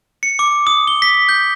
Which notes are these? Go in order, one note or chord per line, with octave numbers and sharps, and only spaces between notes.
C#7
D6
D#6
G7
B6
G6